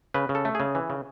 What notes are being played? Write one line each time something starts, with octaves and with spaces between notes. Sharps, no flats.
C#3 B4
C#3
A4
A3
C#3 G#4
E3
C#3